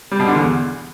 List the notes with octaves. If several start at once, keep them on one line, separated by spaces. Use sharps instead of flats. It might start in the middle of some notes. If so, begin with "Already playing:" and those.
G3
B2
D3
E2